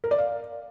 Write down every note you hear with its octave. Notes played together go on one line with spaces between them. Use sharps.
A#4
D5
F5